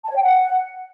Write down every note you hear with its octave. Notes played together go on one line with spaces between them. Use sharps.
A5
C#5
G5
F#5